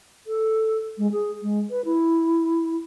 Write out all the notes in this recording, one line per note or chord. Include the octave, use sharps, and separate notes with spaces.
A4
G#3
G#4
G#3
B4
E4